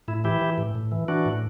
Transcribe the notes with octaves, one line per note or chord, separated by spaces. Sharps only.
A2 E4
E3 E4 G4
E3
A2
A2
E3
E3 D4 F#4
A2